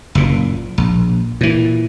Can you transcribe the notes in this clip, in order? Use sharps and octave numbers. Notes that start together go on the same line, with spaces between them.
F#1 A#2
A#1
A#2 E3